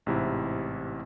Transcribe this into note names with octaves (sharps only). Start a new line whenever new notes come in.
A1 G#2 C3 E4